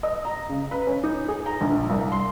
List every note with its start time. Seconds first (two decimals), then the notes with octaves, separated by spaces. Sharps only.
0.03 D#5
0.25 A#5
0.49 C#3
0.71 B4
0.87 C#4
1.04 D#4
1.28 G#4
1.46 A#5
1.61 A#1
1.90 C2
2.12 C6